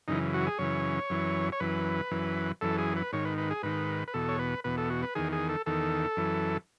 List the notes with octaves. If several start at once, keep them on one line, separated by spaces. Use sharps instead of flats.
F#2 C#3 E3 D#4
F#4
G#4
F#2 C#3 E3 C#5
F#2 E3
C#5
F#2 E3 B4
F#2 E3
F#2 E3 A4
G#4
B4
G#2 D#3 C#5
B4
B4
G#4
G#2 D#3 B4
B4
E2 B2 A4
C#5
B4
E2 B2 B4
A4
F#4
B4
E2 D#3 G#4
G#4
A4
E2 D#3 A4
F#2 E3